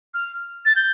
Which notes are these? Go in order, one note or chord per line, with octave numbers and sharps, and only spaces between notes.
F6
A6
G6